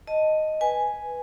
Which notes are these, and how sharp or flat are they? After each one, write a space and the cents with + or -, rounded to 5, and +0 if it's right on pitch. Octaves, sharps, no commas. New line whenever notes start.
D#5 +0 A5 +0
B4 +0 G#5 +0